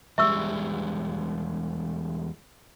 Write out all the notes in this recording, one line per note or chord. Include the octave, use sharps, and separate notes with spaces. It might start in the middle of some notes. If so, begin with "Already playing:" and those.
E2 G3 G#3 E5 C#6 E6